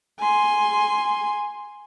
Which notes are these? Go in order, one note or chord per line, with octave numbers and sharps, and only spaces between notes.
G#5 C6